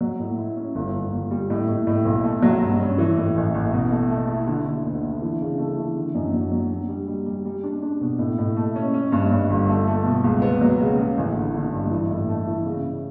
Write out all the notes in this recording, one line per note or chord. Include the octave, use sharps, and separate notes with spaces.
F#3
A2
E4
C#4
G1
G1
G1
G3
A2
A2
A2
B1
A3
F#3
G2
C#4
E3
A2
A1
A1
B2
A3
A3
E4
D3
D3
D2
D3
E3
C#3
A3
E3
D3
F#2
F#3
F#3
D4
G3
G3
G3
G3
D4
D4
B2
A2
A2
A3
C#4
C#4
G2
G2
G1
A3
A3
B2
C#2
B3
F#3
C#3
C#3
A1
D3
D3
G2
E3
A2
A3
E3
C#3
C#3